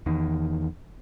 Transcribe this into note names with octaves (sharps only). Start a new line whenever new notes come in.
E2 D#3